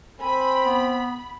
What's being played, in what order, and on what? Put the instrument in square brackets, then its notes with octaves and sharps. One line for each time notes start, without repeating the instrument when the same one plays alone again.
[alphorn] C4 [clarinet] G#5 [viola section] B5
[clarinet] B3